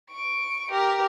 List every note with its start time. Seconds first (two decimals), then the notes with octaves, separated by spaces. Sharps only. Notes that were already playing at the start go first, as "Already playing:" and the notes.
0.11 C#6 D7
0.71 G4 A#4